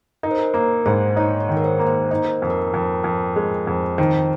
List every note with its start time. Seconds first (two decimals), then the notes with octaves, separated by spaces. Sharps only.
0.23 D#4 A#4
0.31 C5
0.39 A#4
0.54 A#3 A#4
0.86 G#2 C5
1.16 D#4 C#5
1.40 C#5
1.49 D#3
1.57 A#4
1.64 C5
1.79 A#3
1.87 C5
2.11 D#4 C5
2.25 A#4
2.42 F2
2.50 A#4
2.74 F2
3.04 F2
3.36 G#3
3.67 F2
3.98 D#3 C5